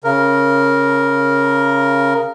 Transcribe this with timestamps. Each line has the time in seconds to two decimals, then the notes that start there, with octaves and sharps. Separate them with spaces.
0.04 C#3 A#4